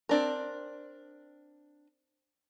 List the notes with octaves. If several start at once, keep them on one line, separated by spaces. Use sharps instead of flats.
C4 D4 A#4